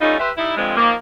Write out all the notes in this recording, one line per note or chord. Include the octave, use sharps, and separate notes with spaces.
G3 A3 C#4 D#4 F4
G4 B4 C5 E5
G3 D#4 E4
G2 D3 F3 G#3 C4
D#3 F3 A#3